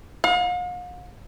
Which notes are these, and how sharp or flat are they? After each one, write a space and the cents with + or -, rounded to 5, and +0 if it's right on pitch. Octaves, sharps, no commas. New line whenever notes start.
F5 +45